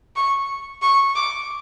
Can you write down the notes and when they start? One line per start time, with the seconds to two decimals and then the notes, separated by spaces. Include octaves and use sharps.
0.16 C#6
0.82 C#6
1.15 D6